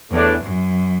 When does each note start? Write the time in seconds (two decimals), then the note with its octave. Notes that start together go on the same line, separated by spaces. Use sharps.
0.11 E2 A2 E3 A3 D4
0.43 F#2